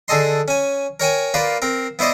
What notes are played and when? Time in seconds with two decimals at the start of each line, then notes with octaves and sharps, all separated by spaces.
0.08 D3 G#4 A4 D#5 C6
0.48 C#4 G#5
1.00 A#4 C#5 G5 G#5
1.34 A#3 F4 B4 D5
1.62 C4 A#4
1.99 B3 E4 C5 D5 D#5